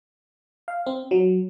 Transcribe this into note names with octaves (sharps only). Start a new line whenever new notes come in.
F5
C4
F#3